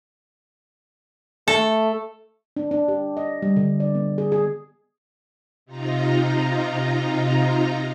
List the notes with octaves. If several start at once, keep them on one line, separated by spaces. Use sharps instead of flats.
A3 A4
D4
D4
G4
D#5
G3
D3
D5
B3
G#4
G#4
C3 D#4 F4 A#5